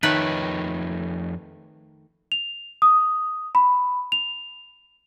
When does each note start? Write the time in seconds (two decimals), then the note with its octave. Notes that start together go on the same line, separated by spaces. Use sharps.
0.03 F2 D#3 A3 D#4 B4 C#5
2.32 F7
2.82 D#6
3.55 B5
4.12 F7